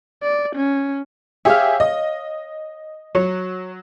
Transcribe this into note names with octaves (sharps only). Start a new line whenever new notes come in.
D5
C#4
G4 G#4 C#5 E5 F5
D#5
F#3 C#5